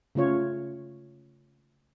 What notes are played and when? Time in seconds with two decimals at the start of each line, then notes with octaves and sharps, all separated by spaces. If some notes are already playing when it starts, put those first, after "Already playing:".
0.15 C#3 A3 F4 C#5